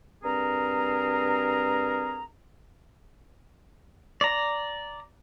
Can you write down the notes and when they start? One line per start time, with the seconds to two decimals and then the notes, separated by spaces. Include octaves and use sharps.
0.23 G2 C4 G#4 A#4 A#5
4.21 D5 A#5